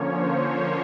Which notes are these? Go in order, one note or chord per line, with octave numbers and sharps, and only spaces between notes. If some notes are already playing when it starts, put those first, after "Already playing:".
Already playing: D3 F3 A#3 C#4 C#5
C5